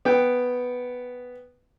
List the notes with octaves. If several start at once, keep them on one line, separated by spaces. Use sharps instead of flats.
B3 G5